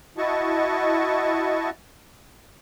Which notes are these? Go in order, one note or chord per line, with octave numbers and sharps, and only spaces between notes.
E4 F#4 D#5 A5 C#6